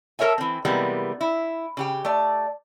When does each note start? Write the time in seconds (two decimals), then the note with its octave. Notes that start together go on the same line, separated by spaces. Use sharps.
0.19 A4 A#4 C#5 E5 G#5
0.38 E3 C4
0.65 C3 E3 G3 G#3 A#3 B3
1.21 E4
1.77 C#3 G4 G5
2.05 A3 D5